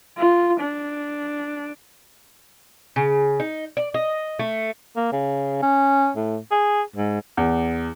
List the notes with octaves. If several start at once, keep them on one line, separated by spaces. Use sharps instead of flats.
F4
D4
C#3
D#4
D5
D#5
A3
A#3
C#3
C#4
A2
G#4
G#2
E2